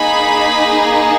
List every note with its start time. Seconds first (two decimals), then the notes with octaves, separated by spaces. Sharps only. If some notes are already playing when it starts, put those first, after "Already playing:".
Already playing: A#3 D#4 G#4 B5